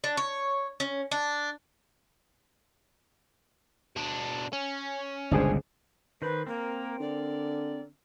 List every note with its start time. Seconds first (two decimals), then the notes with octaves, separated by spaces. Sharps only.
0.04 D4
0.17 C#5
0.80 C#4
1.11 D4
3.96 B2 D4
4.53 C#4
5.31 G1 C#2 B2 D4 G#4 C5
6.22 D#3 B4 C5 B5
6.47 A#3 C4 A#4
7.00 D3 D5